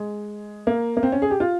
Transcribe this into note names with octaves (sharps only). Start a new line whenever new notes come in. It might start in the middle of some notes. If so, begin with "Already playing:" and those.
Already playing: G#3
A#3
A#3
C4
C#4
G#4
G4
F4